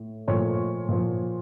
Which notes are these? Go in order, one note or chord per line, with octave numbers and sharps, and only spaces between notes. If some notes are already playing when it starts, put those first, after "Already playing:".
Already playing: A2
A#2 F3 A3 C#5
A#2 F3